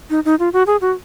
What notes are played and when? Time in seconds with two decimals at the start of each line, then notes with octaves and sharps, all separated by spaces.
0.10 D#4
0.25 D#4
0.39 F4
0.53 F#4
0.67 G#4
0.81 F#4